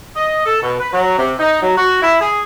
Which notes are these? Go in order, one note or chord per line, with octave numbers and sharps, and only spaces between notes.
D#5
A4
B2
B4
F#3
C3
D#4
F#3
F#4
E4
G#4